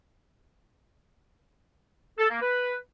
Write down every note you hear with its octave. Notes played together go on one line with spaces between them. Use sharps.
A4
A#3
B4